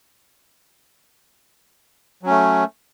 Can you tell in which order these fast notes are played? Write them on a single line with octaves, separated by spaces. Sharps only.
F#3 C#4 A3